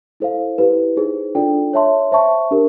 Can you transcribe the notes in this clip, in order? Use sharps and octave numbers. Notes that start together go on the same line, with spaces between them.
E4 A4 C5 F5
E4 G4 B4
D#4 G#4 C5
D4 F4 A4 D5 G5
C#5 E5 A5 C6
C5 E5 A5 C#6
D4 G4 A#4